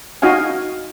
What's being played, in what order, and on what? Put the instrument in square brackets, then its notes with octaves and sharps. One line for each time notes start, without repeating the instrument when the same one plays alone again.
[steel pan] D#4 F#4 D#5 F5 G#5